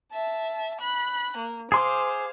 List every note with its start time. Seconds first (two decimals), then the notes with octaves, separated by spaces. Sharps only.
0.12 E5 A5
0.81 B5 F#6
1.38 A#3
1.72 G#4 C5 F5 C6 D6